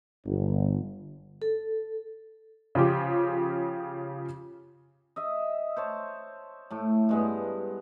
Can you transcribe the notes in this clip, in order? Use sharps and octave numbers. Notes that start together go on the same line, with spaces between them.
G1
A4
C#3 F3 F4 G4
D#5 E5
C5 C#5 A5
A2 A3
G2 G#3 B3